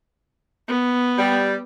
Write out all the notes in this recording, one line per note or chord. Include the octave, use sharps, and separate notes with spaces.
B3
G3